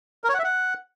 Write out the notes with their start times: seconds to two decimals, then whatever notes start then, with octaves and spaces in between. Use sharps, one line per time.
0.24 A#4
0.29 C#5
0.34 F#5
0.39 E5
0.44 F#5